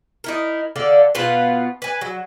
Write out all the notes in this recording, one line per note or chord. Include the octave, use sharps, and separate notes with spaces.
D#4 E4 A#4
D3 A4 D5 F5
B2 B3 F4 B4
B4 G#5
F#3